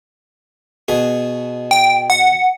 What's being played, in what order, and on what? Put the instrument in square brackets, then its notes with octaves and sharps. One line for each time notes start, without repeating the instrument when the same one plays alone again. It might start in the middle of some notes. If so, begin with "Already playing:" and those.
[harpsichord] B2 G#4
[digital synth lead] G5
F#5